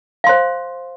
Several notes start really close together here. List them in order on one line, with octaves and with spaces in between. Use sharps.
F5 C6 C5